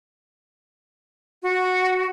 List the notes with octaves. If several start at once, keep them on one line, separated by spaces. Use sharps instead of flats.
F#4